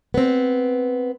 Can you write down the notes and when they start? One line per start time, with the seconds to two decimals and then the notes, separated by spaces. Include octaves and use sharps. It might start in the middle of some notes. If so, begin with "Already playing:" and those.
0.14 B3 C4